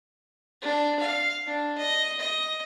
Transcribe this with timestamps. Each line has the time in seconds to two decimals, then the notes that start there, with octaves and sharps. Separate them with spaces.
0.62 D4
1.00 F5
1.47 D4
1.78 D#5
2.20 D#5